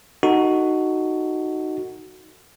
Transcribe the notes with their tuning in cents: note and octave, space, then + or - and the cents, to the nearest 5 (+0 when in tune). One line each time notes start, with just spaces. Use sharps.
D#4 +0 F#4 +0 A4 +25